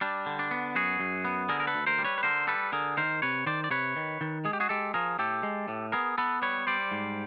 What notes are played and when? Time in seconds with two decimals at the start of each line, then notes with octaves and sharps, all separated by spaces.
0.01 G3 D4
0.26 D3
0.39 D4
0.51 B3
0.75 F#2 F#4 G#4
1.00 F#2
1.25 B3
1.49 D3 G#4 A#4
1.60 A#4
1.67 A4 B4
1.74 D2
1.87 A#4 C5
1.98 G3
2.04 B4 C#5
2.18 B4
2.23 D3 A#4 C5
2.47 G3 A4 B4
2.72 D3 G#4 A#4
2.97 D#3 A#4 C5
3.22 C3 B4 C#5
3.46 D#3 C5 D5
3.64 D5
3.70 C3 B4 C#5
3.96 D#3
4.21 D#3
4.45 G#3 G#4
4.53 G4
4.60 F#4 G#4
4.69 G#3 G4 A4
4.94 F3 G#4 A#4
5.19 A2 G4 A4
5.43 G#3
5.68 A2
5.92 B3 G#4 A#4
6.18 B3 A4 B4
6.42 G3 B4 C#5
6.67 G3 C5 D5
6.91 G#2